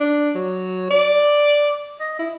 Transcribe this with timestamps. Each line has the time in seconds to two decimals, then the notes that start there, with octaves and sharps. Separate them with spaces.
0.01 D4
0.35 F#3
0.91 D5
2.00 D#5
2.19 E4